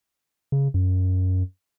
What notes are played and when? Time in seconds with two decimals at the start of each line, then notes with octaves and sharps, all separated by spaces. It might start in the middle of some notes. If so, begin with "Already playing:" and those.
0.52 C#3
0.74 F#2